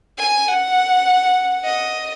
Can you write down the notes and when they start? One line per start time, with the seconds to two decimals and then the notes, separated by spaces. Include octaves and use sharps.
0.18 G#5
0.47 F#5
1.65 D#5